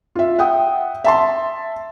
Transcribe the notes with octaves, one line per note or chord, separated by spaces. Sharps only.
F4 E5
E5 F#5 G5 D#6
E5 A5 C6